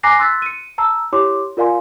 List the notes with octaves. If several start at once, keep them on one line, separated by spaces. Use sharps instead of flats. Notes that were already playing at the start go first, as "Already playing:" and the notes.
G#5 A#5 D6 F#6 A#6 C7
C6 E6 F#6 A6 B6
C#7 D#7
A5 A#5 E6
E4 G4 C#5 C6 D6
F4 A#4 D5 F5 G#5 C6